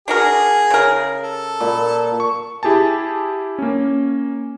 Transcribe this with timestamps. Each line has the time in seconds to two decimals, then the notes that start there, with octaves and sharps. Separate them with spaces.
0.08 D4 F#4 G#4 A#4
0.70 C#3 A#4
1.23 A4
1.60 A#2 B5
2.20 C#6
2.63 E4 G4 G#4 G#5 A5
3.59 A#3 C#4